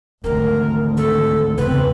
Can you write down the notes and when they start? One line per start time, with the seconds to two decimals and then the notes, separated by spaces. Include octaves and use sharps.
0.24 G#1 D2 E3 C4 A#4
0.97 A4
1.58 E2 C#3 C4 B4